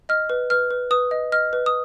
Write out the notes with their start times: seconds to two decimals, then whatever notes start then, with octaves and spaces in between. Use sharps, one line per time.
0.09 D#5 F6
0.30 B4
0.50 B4 F6
0.71 B4
0.91 B4 D#6
1.11 D#5
1.32 D#5 F6
1.53 B4
1.66 D#6